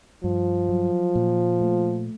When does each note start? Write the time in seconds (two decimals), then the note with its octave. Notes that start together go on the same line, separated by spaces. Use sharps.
0.24 G2 F3
0.69 F#3
1.15 A#2
1.61 A3